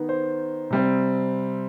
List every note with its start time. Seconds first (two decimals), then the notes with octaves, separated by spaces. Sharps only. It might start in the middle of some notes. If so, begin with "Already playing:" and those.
Already playing: D#3 B3
0.09 C5
0.71 C3 G3 C4